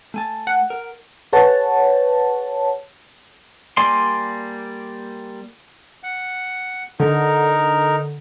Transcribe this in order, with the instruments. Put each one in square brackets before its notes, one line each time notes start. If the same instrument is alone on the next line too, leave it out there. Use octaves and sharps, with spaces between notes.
[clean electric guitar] A3 G#5 A5
[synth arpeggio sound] F#5
[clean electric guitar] A#4
[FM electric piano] G#4 B4 C#5 F#5 A5
[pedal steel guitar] G3 A#3 D5 G#5 C6
[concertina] F#5
[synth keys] D3 [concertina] D#4 A#4